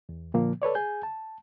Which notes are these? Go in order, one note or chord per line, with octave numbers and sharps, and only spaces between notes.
E2
A#2 D3 F3 A#3
A4 B4 C#5 D5
G#4 G#5 G6
A5